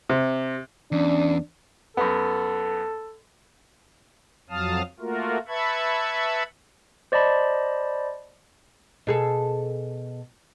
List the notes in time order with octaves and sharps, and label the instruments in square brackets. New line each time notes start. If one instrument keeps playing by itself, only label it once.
[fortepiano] C3
[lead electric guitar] E2 [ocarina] C#4 [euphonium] D4
[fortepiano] F#2 B3 [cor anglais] A4
[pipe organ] F2 F#3 F5 A5 D#6 F6
A3 A#3 F4 F#4 A#4
B4 E5 A5 B5 C#6 G#6
[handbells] C5 D5 D#5 A5 B5
[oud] B2 G#4 A4